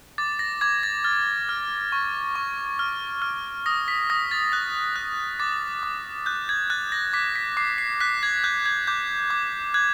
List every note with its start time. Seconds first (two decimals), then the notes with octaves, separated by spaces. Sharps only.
0.18 D6 A6
0.39 A#6
0.61 D6 G#6
0.83 A6
1.04 F6 A6
1.49 F6
1.92 C#6
2.35 C#6
2.79 F6
3.22 F6
3.66 D#6 A#6
3.88 B6
4.10 D#6 A#6
4.31 A6
4.52 F#6 A#6
4.96 F#6
5.40 D6 A6
5.83 D6
6.26 F#6 G6
6.49 G#6
6.70 F#6 A6
6.92 A#6
7.13 D6 B6
7.36 B6
7.57 D6 C7
7.78 C7
8.00 F#6 B6
8.23 G#6
8.44 F#6 G6
8.66 G#6
8.87 D6 G6
9.30 D6
9.74 F#6 G#6